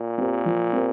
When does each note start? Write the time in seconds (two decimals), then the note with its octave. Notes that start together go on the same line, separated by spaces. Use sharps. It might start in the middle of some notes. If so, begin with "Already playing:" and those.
Already playing: A#2
0.18 C4 G4 A#4
0.45 F3
0.73 C4 G4 A#4